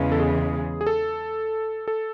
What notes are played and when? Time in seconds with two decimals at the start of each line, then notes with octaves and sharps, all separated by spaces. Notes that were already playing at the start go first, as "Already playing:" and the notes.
Already playing: E2 C#3 E3 G#3
0.12 A4
0.20 G#4
0.81 G#4
0.87 A4
1.88 A4